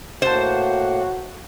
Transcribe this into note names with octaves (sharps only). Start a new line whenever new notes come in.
A2 A#3 F#4 C5 F#5 A5